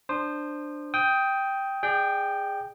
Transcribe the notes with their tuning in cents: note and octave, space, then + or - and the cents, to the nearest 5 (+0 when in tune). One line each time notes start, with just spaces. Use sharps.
D4 +10 C5 +0 D#6 -40
G5 +0 D#6 +20
G#4 -20 D5 +35 G5 +0